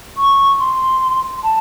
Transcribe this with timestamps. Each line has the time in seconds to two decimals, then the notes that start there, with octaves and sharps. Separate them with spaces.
0.17 C#6
0.60 C6
1.43 A5